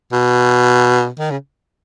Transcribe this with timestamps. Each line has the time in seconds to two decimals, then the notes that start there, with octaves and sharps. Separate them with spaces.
0.12 B2
1.19 D#3
1.31 C#3